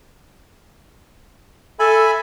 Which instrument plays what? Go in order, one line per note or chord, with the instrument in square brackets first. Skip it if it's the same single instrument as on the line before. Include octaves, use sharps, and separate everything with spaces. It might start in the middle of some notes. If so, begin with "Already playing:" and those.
[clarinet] A4 [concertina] E5 G#5 B5